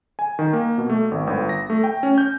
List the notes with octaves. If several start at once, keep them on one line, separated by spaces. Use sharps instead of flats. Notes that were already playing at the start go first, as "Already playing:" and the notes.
G#5
D#3
A#3
B2
A3
G#1
G1
A#6
A3
G5
C#4
G6